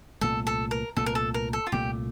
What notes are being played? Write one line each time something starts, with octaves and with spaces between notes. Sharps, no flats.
C2 A#2 A3 A4
A4
A#4
C2 A#2 A3 A4
A#4
A4
A#4
A4
F4
C2 A#2 A3 G4